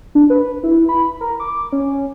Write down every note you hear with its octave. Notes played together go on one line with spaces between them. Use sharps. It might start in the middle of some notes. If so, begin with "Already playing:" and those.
D4
B4
E4
B5
A#4
D6
C#4